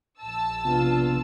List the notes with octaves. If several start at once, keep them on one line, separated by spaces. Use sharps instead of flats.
A#1 A5 E6
C3 B3 D4 F4